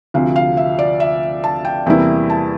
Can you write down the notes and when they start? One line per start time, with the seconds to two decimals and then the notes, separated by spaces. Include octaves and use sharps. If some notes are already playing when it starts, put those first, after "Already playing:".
0.14 D2 C3 F3 F5
0.36 F5
0.57 E5
0.79 D5
1.00 E5
1.44 A5
1.65 G5
1.86 E2 C3 G3 A#3 E4 G5
2.30 A5